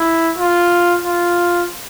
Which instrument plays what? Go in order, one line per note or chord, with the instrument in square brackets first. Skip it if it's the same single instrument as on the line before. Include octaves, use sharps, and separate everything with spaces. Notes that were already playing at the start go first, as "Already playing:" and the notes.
Already playing: [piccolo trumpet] E4
F4
F4